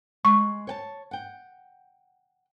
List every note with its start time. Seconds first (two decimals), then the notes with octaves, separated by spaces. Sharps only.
0.25 G#3 C#6
0.67 C#5 G5 A5
1.11 F#5 G5